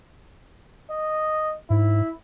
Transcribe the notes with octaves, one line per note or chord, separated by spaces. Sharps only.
D#5
G#2 E4